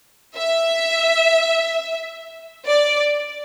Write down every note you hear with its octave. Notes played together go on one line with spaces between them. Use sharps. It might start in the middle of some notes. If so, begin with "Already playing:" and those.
E5
D5